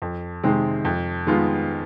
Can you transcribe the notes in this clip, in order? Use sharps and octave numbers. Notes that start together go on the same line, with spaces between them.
F2
C3 D#3 G#3 C4
F2
D#3 G#3 B3 F4